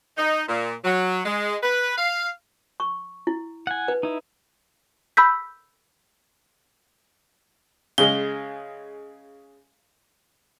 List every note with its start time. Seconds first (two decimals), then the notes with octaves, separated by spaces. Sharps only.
0.18 D#4
0.49 A#2
0.84 F#3
1.25 G#3
1.63 B4
1.98 F5
2.80 C#6
3.27 E4
3.67 F#5 G#5
3.88 B4
4.03 D#4 E4
5.17 B5 E6 G6 B6
7.98 C#3 G#3 G7